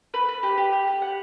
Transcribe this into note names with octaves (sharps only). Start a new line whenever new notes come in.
B4
B4
G4
G4
G4
G4
F#5